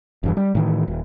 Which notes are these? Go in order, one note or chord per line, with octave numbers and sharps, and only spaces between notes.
E1 G2 E3
G3
A2 D#3 E3
D#1